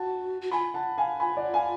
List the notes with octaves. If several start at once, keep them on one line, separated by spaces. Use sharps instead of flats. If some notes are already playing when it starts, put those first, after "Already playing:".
Already playing: F#4 F#5 A5
F#4
F4 G#5 B5
F#5 A5
F5 G#5
G#5 B5
D5 F#5
F5 G#5